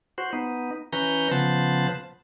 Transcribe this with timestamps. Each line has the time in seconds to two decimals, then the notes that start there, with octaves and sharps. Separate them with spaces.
0.18 F#4 C5
0.33 B3 D#4
0.93 E3 C#4 B4 A#5 G6
1.31 C#3 F3 B3 C5 A5 F#6